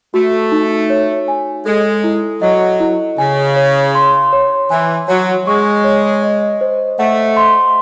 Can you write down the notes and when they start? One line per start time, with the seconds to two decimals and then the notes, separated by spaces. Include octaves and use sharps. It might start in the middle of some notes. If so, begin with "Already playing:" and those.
0.13 A3 F#4
0.52 D#4
0.90 C#5
1.28 G#5
1.65 G#3 A4
2.04 E4
2.42 F#3 D#5
2.80 E4
3.18 C#3 G#5
3.56 C#5
3.95 C6
4.33 C#5
4.70 E3 G#5
5.08 F#3 C#5
5.47 G#3 C#6
5.84 C#5
6.23 D#5
6.61 C5
6.99 A3 F#5
7.37 C6